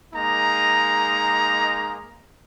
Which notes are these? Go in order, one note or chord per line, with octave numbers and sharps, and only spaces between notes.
G#3 A#3 D#4 A#5